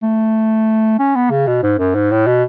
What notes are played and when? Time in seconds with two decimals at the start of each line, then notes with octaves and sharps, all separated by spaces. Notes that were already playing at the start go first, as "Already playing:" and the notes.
0.02 A3
0.99 C#4
1.15 B3
1.30 C#3
1.47 B2
1.63 G#2
1.79 F#2
1.95 G#2
2.11 A2
2.27 B2